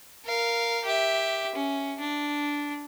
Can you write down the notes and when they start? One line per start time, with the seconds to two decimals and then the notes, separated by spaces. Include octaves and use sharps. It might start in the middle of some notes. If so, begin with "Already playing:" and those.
0.24 A#4 F5
0.85 G4 E5
1.56 C#4
1.99 D4